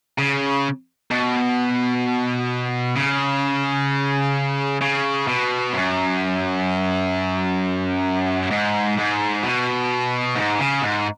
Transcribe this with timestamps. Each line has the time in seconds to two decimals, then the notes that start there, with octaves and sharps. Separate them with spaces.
0.19 C#3
1.11 B2
2.96 C#3
4.81 C#3
5.27 B2
5.73 F#2
8.51 G#2
8.97 G#2
9.43 B2
10.36 G#2
10.59 C#3
10.82 G#2